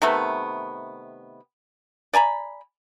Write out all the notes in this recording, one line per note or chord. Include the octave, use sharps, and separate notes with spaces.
C3 D#3 A3 B3
D5 G#5 A#5 B5